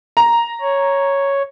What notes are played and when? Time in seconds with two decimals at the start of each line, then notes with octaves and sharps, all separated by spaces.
0.17 A#5
0.62 C#5